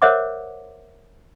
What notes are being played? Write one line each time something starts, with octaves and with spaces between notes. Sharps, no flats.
A#4 C5 C#5 E5 F#5 D6